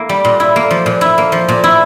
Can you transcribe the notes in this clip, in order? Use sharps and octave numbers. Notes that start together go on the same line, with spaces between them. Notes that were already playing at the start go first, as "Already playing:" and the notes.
Already playing: A#3 E4
G3
A#2
E4
A#3
F3
A#2
E4
A#3
F3
A#2
E4